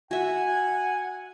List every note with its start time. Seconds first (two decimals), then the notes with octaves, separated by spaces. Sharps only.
0.11 F#4 E5 F#5 G#5